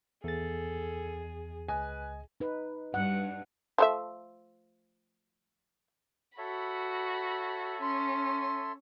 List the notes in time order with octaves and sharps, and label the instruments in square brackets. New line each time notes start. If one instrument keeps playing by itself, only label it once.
[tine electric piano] E2 A6 [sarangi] G#4 [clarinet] A4
[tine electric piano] C#2 D#5 [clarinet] B4 [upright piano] G#5
[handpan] D#4 B4
[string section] G2 [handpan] F#5
[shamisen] F3 A3 E5
[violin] F#4 B5 [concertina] A4 C#5 E5
[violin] C#4 [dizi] C6